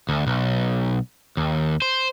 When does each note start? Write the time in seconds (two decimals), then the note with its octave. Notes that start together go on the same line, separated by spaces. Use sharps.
0.09 D2
0.27 B1
1.37 D#2
1.82 C5